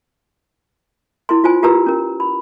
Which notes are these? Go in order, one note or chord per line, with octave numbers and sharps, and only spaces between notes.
E4 A#4 C6
F4 C5 G#5
F4 G4 A#4 B4 A#5 E6
C#4 A#4
B5